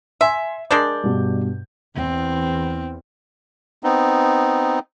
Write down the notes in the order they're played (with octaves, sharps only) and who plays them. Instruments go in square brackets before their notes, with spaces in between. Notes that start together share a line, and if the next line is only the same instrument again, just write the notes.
[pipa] E5 [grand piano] G#5 C6
[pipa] G#3 D4 D5 [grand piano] A#4 G6
[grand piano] G2 B2
[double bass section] E2 [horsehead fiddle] C4
[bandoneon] B3 C4 D#4